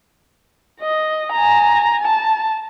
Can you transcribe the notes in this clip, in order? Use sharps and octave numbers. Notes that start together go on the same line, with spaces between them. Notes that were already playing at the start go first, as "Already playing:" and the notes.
D#5
G#5 A#5
A5